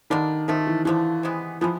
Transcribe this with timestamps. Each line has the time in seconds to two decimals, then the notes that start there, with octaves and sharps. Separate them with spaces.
0.10 D3 D#3 G3 A#3 D4
0.48 C3 D#3 F3 A3
0.67 E3
0.85 D3 E3 F3 A3
1.23 C3 E3 G#3 B3
1.61 E3 F3 G#3 B3